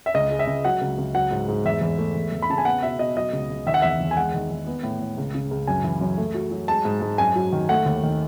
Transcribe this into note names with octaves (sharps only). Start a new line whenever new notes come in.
E5
C#2 D#5
G#3
E5
C#2
F#3 F#5
C#2
C#2
F#3 F#5
G#2
G#2
E2 E5
E2
A3
E2
E2
B5
C#3 A5
G#5
B3 F#5
B2 E5
B2 D#5
F#3 D#5
C#2
C#2
D#3 E5
F#5
E2 E5
E2
G#5
G#3 F#5
D#3
D#3
B3
A2
A2
C#2
C#3
C#2
F#2 G#5
E3
F#2
A3
F#3
F#3
G#3 A5
G#2
G#2
F#2 G#5
F#3
D#3
A3 F#5
D#2
D#3